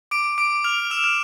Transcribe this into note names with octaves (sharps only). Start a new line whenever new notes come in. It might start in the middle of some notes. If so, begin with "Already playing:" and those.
D6 D7
D6
D6 D7
F6 F7
E6 E7
F6